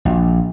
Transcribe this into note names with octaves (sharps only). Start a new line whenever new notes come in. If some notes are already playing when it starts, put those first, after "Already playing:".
A#1